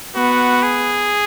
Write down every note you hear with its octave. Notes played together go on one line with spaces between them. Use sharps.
B3 F#4
G#4